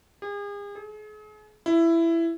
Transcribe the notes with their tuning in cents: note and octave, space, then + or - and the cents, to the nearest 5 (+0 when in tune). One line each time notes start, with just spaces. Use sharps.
G#4 -40
G#4 +40
E4 +15